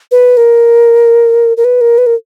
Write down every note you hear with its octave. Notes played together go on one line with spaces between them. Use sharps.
B4
A#4
A#4
B4
A#4
B4
A#4